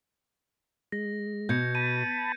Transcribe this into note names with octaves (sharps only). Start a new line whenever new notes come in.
G#3 A#6
B2 G6 G#6 C#7
A5 B5 D#7